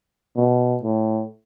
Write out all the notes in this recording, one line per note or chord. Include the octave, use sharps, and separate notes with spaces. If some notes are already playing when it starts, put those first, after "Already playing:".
B2
A2